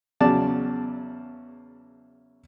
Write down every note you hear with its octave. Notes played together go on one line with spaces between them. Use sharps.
E2 C#3 F#3 D5 A5